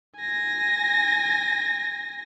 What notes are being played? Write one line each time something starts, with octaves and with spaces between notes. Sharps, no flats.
G#5 A#6